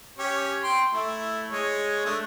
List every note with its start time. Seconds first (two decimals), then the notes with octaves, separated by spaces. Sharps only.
0.18 C#4 G4 C#5
0.63 G5 C6
0.94 A3 E4
1.50 G#3 C#5
2.05 A3 D4